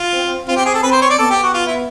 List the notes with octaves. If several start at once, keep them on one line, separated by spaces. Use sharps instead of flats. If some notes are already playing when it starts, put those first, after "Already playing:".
Already playing: F4
C4
C4 F4
G4
G#4
A4
C4 B4
C5
C#5
D5
B3 A4
G4
F#4
F4
E4